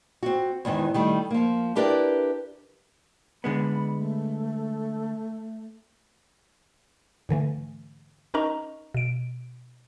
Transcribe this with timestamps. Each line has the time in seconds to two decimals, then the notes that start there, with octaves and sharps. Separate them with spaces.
0.23 C4 F#4
0.65 E2 G#2 D#3 E3
0.94 D#3 G3 A3
1.30 F3 A#3
1.75 D4 E4 G4 A#4 B4 D5
3.44 D3 G#3 B3 B5
3.98 A3
7.29 G#2 D3 E3 A3
8.34 C#4 D#4 A#4 D#5 A#5 C#6
8.94 B2 D7